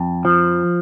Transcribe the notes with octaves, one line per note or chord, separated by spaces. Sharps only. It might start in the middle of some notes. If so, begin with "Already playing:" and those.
Already playing: F2
F3